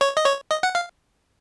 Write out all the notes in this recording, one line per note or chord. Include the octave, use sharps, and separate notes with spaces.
C#5
D#5
C#5
D#5
F#5
F5